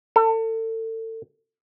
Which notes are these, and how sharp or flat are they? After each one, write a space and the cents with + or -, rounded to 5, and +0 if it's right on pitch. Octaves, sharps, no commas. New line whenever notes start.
A4 +35